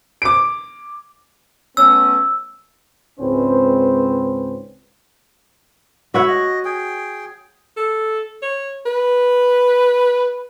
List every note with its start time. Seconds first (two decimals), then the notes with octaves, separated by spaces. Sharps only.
0.22 D6 D7
1.77 A3 B3 C#4 E6
3.19 C#2 G#2 C4 C#4 B4 C5
6.14 F#4 C#5 E5 F#5 B5 C#6
6.28 D#5
6.65 G#4 G5
7.76 A4
8.42 C#5
8.86 B4